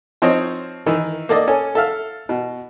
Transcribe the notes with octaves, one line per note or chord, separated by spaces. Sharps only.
F3 C4 D#4 C#5 D#5
D#3 E3
A#3 A4 D5 D#5
C#4 A4 G#5
A4 E5 F5
B2